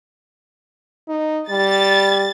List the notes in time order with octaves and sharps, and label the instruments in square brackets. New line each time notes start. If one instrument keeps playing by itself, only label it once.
[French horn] D#4
[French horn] G3 [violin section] A6